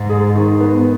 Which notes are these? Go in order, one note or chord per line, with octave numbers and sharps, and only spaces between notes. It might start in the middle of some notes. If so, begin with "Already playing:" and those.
Already playing: G#2
G#4
D#3
B3